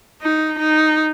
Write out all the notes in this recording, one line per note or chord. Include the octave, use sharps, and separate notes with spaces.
D#4
D#4